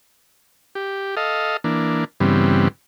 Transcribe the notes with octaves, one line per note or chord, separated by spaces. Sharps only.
G4
A4 D#5 F5
E3 A#3 D4
G2 C#3 E3 G3 B3 C4